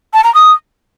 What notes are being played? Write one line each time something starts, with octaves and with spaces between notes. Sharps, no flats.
A5
A#5
D#6